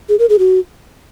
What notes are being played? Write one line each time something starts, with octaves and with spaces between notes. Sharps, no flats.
G#4
A#4
G#4
F#4